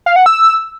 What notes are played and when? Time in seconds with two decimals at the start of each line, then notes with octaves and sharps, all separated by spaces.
0.06 F5
0.16 F#5
0.26 E6